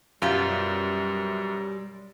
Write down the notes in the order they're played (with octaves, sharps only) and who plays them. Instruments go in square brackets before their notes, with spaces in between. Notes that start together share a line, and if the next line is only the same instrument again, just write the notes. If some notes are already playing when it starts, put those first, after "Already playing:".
[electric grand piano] F#2 [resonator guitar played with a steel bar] B2 F4 G4 [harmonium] G3